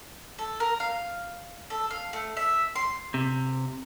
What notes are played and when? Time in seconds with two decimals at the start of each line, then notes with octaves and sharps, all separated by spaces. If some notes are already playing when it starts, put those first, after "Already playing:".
0.38 A4
0.60 A#4
0.80 F5
1.70 A4
1.91 F5
2.13 A3
2.37 E5
2.75 C6
3.14 C3